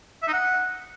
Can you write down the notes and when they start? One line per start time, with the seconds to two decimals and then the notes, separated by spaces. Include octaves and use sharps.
0.22 E5
0.28 D#4
0.33 F#5